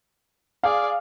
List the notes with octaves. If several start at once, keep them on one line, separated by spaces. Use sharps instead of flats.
G#4 D5 F5